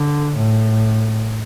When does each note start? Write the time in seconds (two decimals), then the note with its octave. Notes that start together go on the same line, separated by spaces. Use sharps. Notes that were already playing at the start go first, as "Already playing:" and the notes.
Already playing: D3
0.36 A2